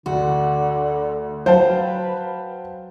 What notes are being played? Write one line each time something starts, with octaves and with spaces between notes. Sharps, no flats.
D2 D3 F#4
F#3 B4 C5 F5 G5 A5